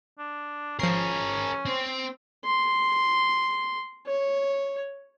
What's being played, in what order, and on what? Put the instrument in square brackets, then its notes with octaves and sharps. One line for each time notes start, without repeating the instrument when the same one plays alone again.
[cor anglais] D4
[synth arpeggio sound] F3 C7 [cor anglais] C#4 [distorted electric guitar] G#4 A#4
[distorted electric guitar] C4 C5
[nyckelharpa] C6
C#5